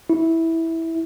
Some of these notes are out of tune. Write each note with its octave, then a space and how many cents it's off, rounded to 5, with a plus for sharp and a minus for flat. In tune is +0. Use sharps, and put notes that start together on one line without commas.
E4 -10